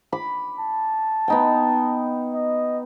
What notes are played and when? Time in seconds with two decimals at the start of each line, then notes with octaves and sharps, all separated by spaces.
0.12 B5 D6
0.59 A5
1.28 B3 D#4 G5
2.35 D#5